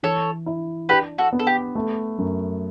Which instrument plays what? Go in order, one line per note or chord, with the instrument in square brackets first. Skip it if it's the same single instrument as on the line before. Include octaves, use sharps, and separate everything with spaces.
[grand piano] E3 [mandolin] A4 C#5
[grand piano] E4
[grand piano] D4 [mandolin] G4 B4
[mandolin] F#4 A4
[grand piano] B3
[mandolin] A4
G4
[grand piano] A3
F#2